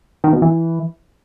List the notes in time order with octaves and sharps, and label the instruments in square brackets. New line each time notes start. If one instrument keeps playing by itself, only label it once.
[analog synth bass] D#3
B2
E3